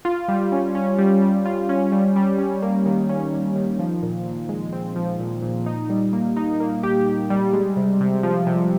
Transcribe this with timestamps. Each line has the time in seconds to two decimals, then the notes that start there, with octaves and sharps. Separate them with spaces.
0.05 F4
0.28 G3
0.52 C#4
0.75 C#4
0.99 G3
1.22 G3
1.46 F4
1.69 C#4
1.92 G3
2.16 G3
2.39 C#4
2.62 A#3
2.86 D#3
3.09 C#4
3.32 D#3
3.56 D#3
3.79 F3
4.02 A#2
4.26 A#2
4.49 G#3
4.73 C4
4.96 F3
5.19 A#2
5.43 A#2
5.66 D#4
5.89 G3
6.13 A#3
6.37 D#4
6.60 A#3
6.83 G4
7.07 G4
7.30 G3
7.53 G#3
7.77 C3
8.00 C3
8.23 F3
8.47 C3